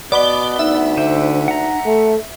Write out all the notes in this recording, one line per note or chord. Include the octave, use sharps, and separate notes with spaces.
B2 B3 D5 B5 G7
D2 D#4 E5
D3 C5
F#5 A#5
A3 A4